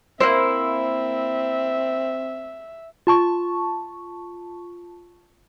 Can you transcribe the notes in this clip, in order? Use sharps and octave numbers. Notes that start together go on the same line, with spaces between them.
A#3 C4 E4 C5 E5
F4 A5 C#6